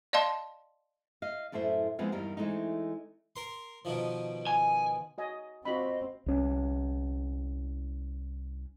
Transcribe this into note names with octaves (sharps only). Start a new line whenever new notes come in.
D5 D#5 F5 A5 C6
D#5 F5
F#2 A2 A3 C5 E5
F3 G#3 B3 C4 E4 F4
E2 G2 D#3 G3 A#4
E3 G#3 A3 C4 D#4
A#4 C6
B2 D#3 F3
G#5
F#4 D#5 G#5
C4 F4 F#4 D#5 B5
C2 C#4